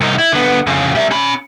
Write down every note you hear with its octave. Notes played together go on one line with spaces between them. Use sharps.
C2 D#4
E4
D3 B3
F2 C#3
G3 E5
C#4 B5